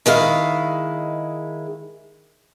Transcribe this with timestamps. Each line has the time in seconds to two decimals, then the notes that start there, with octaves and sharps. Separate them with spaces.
0.06 D#3 G#3 E4 F5